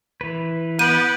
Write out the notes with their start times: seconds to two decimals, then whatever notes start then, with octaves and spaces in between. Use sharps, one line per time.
0.21 E3 B4
0.79 B3 G6 D7 D#7 F#7